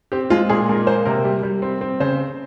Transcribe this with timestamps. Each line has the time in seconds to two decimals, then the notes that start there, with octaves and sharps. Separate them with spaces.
0.12 C4 G4
0.30 G#3 F4
0.50 A#2 G#4
0.69 G#3 A#4
0.87 A#3 C5
1.05 C3 A#4
1.25 G3
1.43 G3
1.62 C4
1.81 C4
2.00 C#3 C5